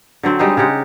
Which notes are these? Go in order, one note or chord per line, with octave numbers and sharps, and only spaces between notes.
D3 F#3 C4
G3 G#3 D#4 C5
C#3 D#4 G4 F#5